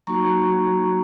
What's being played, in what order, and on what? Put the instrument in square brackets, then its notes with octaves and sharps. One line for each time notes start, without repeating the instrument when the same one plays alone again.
[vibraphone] F#3 A#3 D#4 F#4 A#5 C#6